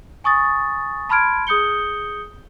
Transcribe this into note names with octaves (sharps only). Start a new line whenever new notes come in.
G#5 C#6 D#6 A6
A5 B5 C6 F6 G#6 D7
G#4 D#6 G6 C#7 G7